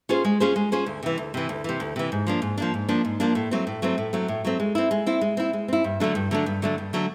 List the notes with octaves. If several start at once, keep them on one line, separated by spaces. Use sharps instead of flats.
C#4 F4 G#4 C5
G#3
C#4 F4 G#4 C5
G#3
C#4 F4 G#4 C5
D2
C3 E3
D2
C3 E3
D2
C3 E3
D2
C3 E3
G#2
F3 A#3 D4
G#2
F3 A#3 D4
G#2
F3 A#3 D4
G#2
F3 A#3 D4
A2
F#3 A3 C4
A2
F#3 A3 C4
A2
F#3 A3 C4
A2
F#3 A3 C4
G#3
C4 E4
G#3
C4 E4
G#3
C4 E4
G#3
C4 E4
G2
D3 F#3 A3 D4
G2
D3 F#3 A3 D4
G2
D3 F#3 A3 D4
G2
D3 F#3 A3 D4